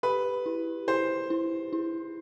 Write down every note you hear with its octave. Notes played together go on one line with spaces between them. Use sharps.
G4 B4
E4
E4 C5
E4
E4